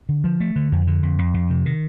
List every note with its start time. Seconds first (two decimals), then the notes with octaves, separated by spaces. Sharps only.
0.09 D3
0.24 F3
0.40 A3
0.56 D3
0.72 F2
0.87 D3
1.03 F2
1.19 F2
1.34 F2
1.50 C3
1.66 D#3